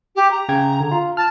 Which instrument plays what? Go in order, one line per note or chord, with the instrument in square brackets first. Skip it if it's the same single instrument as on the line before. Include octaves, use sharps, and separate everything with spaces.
[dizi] G4
A#5
[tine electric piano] C#3 G5 G#6
D3
F4
[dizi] A5 [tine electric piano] F6